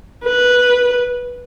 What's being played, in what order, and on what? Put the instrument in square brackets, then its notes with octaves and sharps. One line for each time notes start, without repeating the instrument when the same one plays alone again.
[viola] B4